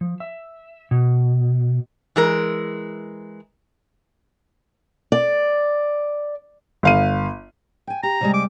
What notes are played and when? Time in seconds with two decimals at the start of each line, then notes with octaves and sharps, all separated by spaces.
0.01 F3
0.20 E5
0.91 B2
2.16 E3 G#3 A#4
5.12 D5
6.83 G1 F5 D#7
7.87 G5 G#5
8.03 G4 A#5
8.21 C3 G3 G#3
8.34 D6